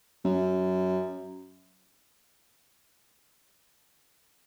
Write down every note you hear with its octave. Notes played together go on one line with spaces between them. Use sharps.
F#2